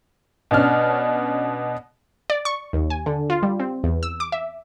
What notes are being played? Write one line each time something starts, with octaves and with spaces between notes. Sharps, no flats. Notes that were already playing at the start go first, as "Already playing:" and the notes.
B2 C#4 D4 F6
D5
C#6
D#2
G#5
D3
F4
G3
C4
E2
E6
D6
E5